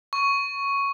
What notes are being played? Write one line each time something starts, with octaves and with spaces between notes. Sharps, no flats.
C#6